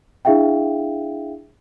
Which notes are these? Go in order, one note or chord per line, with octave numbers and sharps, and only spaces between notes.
D4 E4 G#4 E5 F5 G5